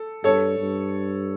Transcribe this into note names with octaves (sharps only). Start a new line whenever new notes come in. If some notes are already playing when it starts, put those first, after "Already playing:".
Already playing: A4
G2 A4 C#5
G2